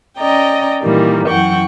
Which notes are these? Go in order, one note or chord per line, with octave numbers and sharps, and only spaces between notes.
C#4 D5 D#5 G5 A#5
A#2 D#3 E3 G3 A#3
F#2 E3 F#5 G5 C#6